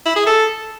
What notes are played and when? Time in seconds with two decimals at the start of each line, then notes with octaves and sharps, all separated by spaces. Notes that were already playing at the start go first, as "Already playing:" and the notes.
0.06 E4
0.16 G#4
0.27 A4